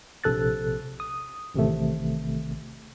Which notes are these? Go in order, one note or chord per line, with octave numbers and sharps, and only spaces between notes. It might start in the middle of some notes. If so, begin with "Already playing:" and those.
A#1 C3 A4 F#6 A6
D#6
A1 C3 D#3 A3